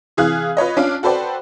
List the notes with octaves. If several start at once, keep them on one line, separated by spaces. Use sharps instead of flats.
C3 E3 G#4 F5 D#6 F#6
F4 B4 C#5 D#5
C#4 D4 F4 F5
F#4 A4 B4 C5 D5 G5